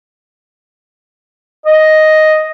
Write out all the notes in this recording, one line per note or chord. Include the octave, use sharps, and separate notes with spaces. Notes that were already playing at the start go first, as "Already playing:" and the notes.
D#5